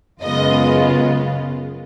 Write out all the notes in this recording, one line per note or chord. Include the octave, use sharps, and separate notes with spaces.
F#2 C#3 G#3 B3 F4 D#5